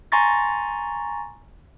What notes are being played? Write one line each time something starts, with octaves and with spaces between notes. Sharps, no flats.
G#5 A#5 C6 C#6 A6 A#6